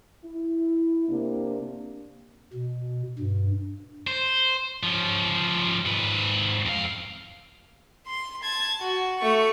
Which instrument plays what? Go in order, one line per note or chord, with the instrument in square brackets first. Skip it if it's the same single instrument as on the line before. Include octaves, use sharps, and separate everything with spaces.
[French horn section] E4
C3 A#3 D4
[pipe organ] B2
G2
[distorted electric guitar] C5
F3 C#4
G#2 B4
F2 F5
[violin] C6
A5 G#6
F#4
A3 C#6